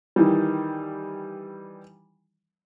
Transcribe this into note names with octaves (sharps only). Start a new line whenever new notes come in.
D#3 E3 G3